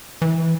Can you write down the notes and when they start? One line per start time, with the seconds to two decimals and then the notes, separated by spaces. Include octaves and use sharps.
0.22 E3